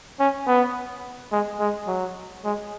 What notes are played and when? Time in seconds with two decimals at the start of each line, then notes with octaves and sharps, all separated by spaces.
0.20 C#4
0.47 B3
1.32 G#3
1.60 G#3
1.88 F#3
2.44 G#3